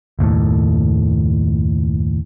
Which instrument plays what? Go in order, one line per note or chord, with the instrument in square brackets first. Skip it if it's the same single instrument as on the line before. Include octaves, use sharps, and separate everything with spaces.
[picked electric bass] F#1 D#2 A2